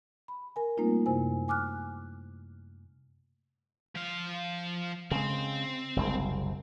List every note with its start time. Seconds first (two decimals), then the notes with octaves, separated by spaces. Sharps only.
0.28 B5
0.56 A#4 G#5
0.77 G3 A3 A#3 C4 D#4 F4
1.06 F#2 C3 E4 C5 G#5
1.48 G#5 D6 F6 F#6
3.96 F3 F5
5.11 C#3 G#3 C4
5.96 F#1 C2 G#3